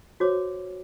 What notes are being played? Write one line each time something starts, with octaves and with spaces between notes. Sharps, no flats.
F#4 C5 C#5 D6